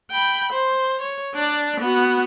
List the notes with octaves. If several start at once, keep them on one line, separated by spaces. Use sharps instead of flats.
G5 B5
C5
C#5
D4 D5
B3 F#4